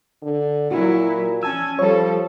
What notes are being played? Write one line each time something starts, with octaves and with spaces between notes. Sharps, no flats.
D3
A#2 F#3 E4 F#4
C#4 G#5 A5 E6
F3 G3 A4 C#5 A5